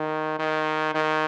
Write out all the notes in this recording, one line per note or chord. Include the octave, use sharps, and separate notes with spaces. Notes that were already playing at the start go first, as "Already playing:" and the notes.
Already playing: D#3
D#3
D#3